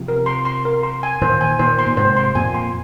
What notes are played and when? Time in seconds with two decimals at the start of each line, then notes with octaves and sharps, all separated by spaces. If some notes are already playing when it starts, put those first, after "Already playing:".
Already playing: C3 F3
0.08 A#4
0.26 C6
0.45 C6
0.65 A#4
0.83 C6
1.03 G#5
1.21 A#2 D#3 C5
1.41 G#5
1.59 A#2 D#3 C5
1.79 C6
1.86 A#2
1.97 G#2 C3 C5
2.17 C6
2.35 F2 A#2 G#5
2.55 C6